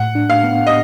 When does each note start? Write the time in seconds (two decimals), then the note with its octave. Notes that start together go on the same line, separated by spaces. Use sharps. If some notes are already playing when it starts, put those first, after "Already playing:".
Already playing: A2 F#5
0.15 D4
0.29 F5
0.44 B3
0.67 D#5